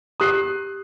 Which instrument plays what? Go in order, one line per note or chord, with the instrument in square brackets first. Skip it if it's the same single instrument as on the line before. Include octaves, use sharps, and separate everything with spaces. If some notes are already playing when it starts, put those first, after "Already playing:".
[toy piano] G4 A#5 [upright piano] D#6 F#6 C7